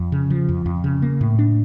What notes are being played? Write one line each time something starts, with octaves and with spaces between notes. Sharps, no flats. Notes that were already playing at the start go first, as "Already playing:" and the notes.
Already playing: F2
C#3
F3
F2
F2
C#3
A#3
A2
D4